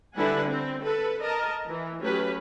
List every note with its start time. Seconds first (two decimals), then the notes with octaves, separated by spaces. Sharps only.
0.16 D3 G3 E4 B4 F#5 G#5
0.47 C4
0.83 A4 B4
1.23 A#4 D#5 A5
1.66 E3
2.02 F#3 A3 C#4 G4 B4